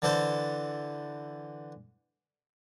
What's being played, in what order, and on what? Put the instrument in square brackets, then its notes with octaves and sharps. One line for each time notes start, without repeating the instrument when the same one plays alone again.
[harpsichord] D3 E3 A4 C5